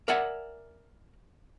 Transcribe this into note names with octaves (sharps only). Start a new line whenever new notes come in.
A#4 D5 E5 F#5 G#5